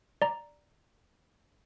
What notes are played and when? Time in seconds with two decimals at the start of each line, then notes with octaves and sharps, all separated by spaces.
0.22 D5 A#5